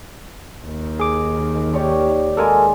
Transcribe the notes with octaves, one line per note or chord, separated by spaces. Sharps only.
D#2 D#3
G#4 D6
G4 C#5 D5
G#3 F4 A4 A#4 G#5 D6